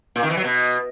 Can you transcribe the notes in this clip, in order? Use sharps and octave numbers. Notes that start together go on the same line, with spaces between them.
A#2
D#3
E3
F#3
B2